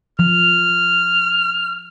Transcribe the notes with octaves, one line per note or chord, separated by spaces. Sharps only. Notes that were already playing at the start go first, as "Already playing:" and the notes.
F3 F6